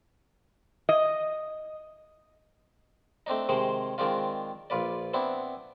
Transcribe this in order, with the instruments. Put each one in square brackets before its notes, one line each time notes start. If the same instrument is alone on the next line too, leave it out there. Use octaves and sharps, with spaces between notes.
[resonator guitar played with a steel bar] D#5
[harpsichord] A3 C4 D4 D#4
C3 D#3 G#3 G#4 C5
D#3 G#3 C4 D4 F4
A#1 F4 B4 D5
B3 C4 D4 E4